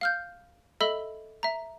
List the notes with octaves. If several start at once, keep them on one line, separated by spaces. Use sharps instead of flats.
F5 F6 G6
A4 D#5 E5 B5 E6 G7
E5 A#5